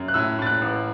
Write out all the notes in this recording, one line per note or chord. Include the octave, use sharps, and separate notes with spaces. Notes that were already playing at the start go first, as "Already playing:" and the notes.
Already playing: F#2
F#6
A2 E6
A2 A6
F#6
A1